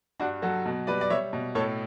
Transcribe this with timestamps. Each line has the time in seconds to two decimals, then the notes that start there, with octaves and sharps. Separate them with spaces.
0.20 G2 D4 F#4
0.42 F#3 F#4 A4
0.66 B2
0.87 G3 B4 D5
1.01 D5
1.10 G3 C#5 E5
1.33 B2
1.55 A2 A4 C#5